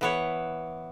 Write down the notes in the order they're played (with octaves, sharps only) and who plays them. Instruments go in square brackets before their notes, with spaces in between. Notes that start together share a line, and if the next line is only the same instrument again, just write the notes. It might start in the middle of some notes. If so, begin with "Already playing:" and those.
[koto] E3 B3 C#5